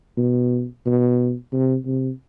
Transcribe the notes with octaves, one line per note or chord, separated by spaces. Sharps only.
B2
B2
C3
C3